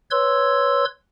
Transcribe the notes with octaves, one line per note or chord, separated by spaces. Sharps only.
B4 C#5 C6 E6 G#6